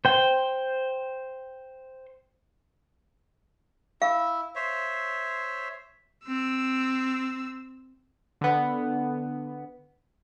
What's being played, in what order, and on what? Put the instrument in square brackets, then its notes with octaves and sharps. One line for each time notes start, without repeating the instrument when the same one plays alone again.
[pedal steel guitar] C5 G5
[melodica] E4 [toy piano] F5
[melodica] C5 C#5 E5
[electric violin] C4 E6
[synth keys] D3 B3